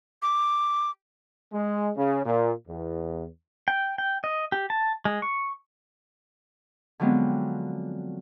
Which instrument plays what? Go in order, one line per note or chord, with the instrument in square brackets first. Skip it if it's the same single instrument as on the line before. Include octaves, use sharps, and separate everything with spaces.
[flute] D6
[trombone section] G#3
C#3
A#2
E2
[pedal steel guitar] G5
G5
D#5
G4
A5
G#3
C#6
[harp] D3 F3 F#3 G#3 B3 C4